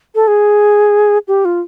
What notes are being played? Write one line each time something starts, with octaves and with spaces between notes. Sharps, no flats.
A4
G#4
G4
F4